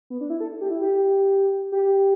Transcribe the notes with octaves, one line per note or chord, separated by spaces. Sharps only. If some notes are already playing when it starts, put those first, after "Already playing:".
B3
D4
E4
A4
G4
E4
G4
G4